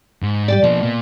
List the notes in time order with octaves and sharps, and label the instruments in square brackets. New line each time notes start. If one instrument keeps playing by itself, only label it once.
[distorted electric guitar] G#2
[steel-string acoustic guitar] G3 G4 D5
[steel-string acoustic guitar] B2 [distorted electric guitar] F3 A#3
[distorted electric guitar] A#2 A#3